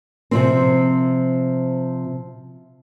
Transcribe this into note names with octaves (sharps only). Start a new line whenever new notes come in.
C3 F3 C4